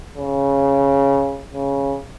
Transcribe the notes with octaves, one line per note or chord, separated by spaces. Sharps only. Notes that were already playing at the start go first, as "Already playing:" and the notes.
C#3
C#3